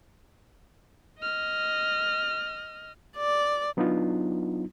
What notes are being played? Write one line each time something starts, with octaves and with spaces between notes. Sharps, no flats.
D#5 F6
D5
F#3 B3 D4 D#4 F4